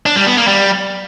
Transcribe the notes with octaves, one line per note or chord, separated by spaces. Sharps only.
D4
G3
B3
A#3
G3